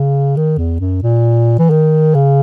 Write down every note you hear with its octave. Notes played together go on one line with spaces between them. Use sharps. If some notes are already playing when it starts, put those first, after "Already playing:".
Already playing: C#3
D#3
E2
F#2
A#2
E3
D#3
C#3